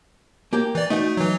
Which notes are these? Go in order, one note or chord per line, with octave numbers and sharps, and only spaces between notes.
A#3 G4 G5
E3 D5
A3 D#4 F#4
E3 F#3